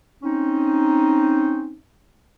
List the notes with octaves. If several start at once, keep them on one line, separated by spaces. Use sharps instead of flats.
C4 C#4 D#4